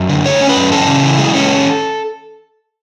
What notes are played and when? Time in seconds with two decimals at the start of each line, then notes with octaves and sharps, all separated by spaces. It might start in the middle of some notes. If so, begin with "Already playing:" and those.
Already playing: F#2 D5
0.09 D3
0.24 A3 C#5
0.41 C#4
0.49 B4
0.56 F#2
0.72 C#4 A4
0.87 C#3
1.04 E3
1.19 G#3
1.34 C#4